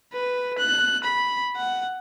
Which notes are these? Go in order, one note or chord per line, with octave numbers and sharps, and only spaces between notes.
B4
F#6
B5
F#5